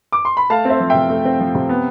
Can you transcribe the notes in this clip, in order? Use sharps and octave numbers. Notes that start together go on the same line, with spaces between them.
D6
C6
B5
A3 F5 A5
C4 C5 E5
F3
C3 E5 G5
A3
C4
F3
C3
B3